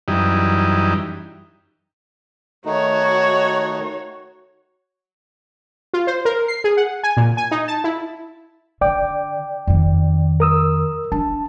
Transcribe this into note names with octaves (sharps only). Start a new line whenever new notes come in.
F#2 E3 G3 D#4
D#3 A3 D#4 F#4 C#5
F4
C5
A#4
C7
G#4
F#5
G#5
A#2
G#5
D#4
A5
E4
D3 D5 G5 D6
F2 D#3
A#4 D#6 E6
D4 A5